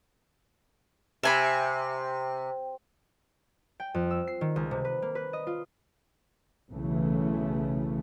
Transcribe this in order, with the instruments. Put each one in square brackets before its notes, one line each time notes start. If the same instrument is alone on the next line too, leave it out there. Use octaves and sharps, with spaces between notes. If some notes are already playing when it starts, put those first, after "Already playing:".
[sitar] C3 [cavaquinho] E5 G#5 B5
[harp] G5
F2
E6
C7
D#3
C#2
C3
B4
A#3
B4
D#5
F4
[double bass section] B1 C#3 E3 A3